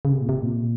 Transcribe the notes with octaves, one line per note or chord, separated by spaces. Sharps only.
C#3
C3
A#2
C3
A#2